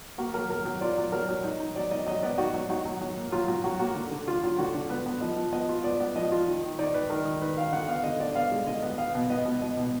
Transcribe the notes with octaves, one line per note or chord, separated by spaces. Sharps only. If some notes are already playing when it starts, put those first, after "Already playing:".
A#3 F#4
F#3 A#4
F#3 A#4
F#3
F4 D5
F#3
F#3 A#4
F#3
D#4
D#4
F#3 D5
D#4 D#5
F#3 D#5
B3 D5
D#4 F#4
F#3
D#4 F#4
F#3
F#3
A#3
F#3 F4
F#3
F#3 F#4
A#3 F#4
D3
D3
D3 F4
F#3 F4
D3 F#4
D3
B3 B4
B3
F3 D#5
F3
B3 D#5
F4
B3 D5
B3
F3 D#5
F4
D#3
D#3
D#4 D5
D#3 B4
D#3 A#4
D#3
D#3 B4
D#3 F5
D3 F#5
B3 F5
D3 D#5
D3 D5
B3 F5
G#3
D3 D#5
B3
B3 F5
B2
B3 D#5
B2
B2 D#5
B2